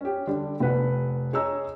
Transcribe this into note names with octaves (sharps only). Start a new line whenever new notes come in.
C#4 G4
D3 G3 D4
F1 B4 F#5
G#4 C#5 D#5 G#5 A#5 E6